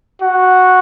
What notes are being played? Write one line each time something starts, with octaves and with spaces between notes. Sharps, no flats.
F#4